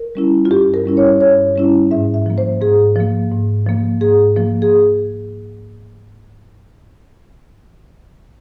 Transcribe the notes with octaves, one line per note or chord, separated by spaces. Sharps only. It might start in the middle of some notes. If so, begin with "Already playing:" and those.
Already playing: A#4
G3 C#4 E4
F4
G2 G4
A#4
G3 C#4 E4
C#5
G2 C#5
G3 C#4 E4
G#2 E5
E5
F3 A#3
C5
G#2 G#4
F3 A#3
G#2
F3 A#3
G#2 G#4
F3 A#3
G#4